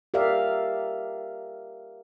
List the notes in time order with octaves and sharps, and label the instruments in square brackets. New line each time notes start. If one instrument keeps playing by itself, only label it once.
[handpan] G4 A#4 D5 E5 F5